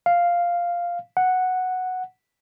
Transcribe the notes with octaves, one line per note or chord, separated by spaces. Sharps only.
F5
F#5